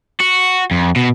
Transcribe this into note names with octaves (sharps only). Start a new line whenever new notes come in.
F#4
F2
B2